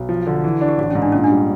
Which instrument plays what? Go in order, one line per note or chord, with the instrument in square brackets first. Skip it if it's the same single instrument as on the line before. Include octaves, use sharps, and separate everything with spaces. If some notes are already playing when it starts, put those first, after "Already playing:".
Already playing: [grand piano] B1
F3
D3
E3
D4
[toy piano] G4
[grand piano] A1 [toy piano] F#4
[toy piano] C#4
[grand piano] G#2
[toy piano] D4
[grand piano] A#2 [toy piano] C#4
[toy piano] D4
[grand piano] G3